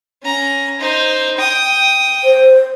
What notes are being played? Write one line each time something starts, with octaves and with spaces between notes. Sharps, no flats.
C#4 A#5
D#4 C5
G5 D#6
C5